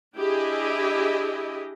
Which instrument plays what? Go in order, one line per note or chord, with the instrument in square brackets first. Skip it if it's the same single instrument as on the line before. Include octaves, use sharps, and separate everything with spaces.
[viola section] D4 E4 G4 G#4 D#5